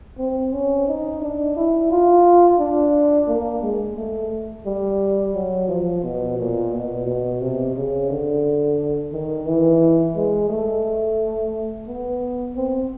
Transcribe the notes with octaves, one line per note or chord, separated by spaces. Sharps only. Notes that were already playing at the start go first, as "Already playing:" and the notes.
C4
C#4
D#4
D4
E4
F4
D4
A#3
G#3
A3
G3
F#3
F3
B2
A#2
B2
B2
C3
C#3
D3
D#3
E3
G#3
A3
B3
C4